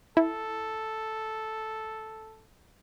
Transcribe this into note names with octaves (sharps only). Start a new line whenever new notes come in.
E4 A4